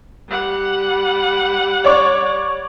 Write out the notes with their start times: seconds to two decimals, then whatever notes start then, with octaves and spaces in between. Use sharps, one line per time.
0.29 G3 F#5
1.84 C#5 D5 C#6